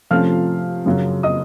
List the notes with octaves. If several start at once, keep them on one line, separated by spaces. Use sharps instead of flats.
C3 F3 A3 C#4 F5 F6
F#2 C#3 F#3
D#5 D#6